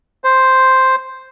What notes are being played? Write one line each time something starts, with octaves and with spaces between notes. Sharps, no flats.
C5